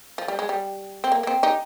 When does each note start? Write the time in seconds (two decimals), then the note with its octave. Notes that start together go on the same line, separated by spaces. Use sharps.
0.18 F3
0.28 G3
0.39 G#3
0.49 G3
1.04 C4
1.12 A#3
1.23 A#3
1.27 C4
1.43 D#4 G4